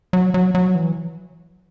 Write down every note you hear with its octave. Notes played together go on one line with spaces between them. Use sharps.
F#3
F#3
F#3
E3